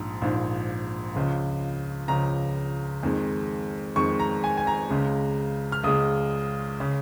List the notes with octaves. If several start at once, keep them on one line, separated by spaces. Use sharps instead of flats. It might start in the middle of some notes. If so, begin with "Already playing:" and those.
Already playing: A#1 G#2 F3
A#1 G#2 F3
C#2 C#3 F3
C#2 C#3 F3 A#5
F2 D#3 G#3
F2 D#3 G#3 C#6
A#5
G#5
G#5
A#5
C#2 C#3 G#3
F6
C#2 C#3 G#3 D#6
C#3